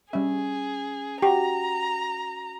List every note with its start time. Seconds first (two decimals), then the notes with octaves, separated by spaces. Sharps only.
0.13 G3 C#4 G#4 E5
1.22 F#4 G4 F#5 G5 A#5